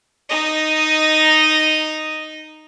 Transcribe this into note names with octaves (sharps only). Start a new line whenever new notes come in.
D#4 D#5